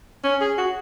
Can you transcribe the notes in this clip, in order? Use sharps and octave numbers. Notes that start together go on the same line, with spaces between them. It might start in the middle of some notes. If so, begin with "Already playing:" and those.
C#4
G#4
F#4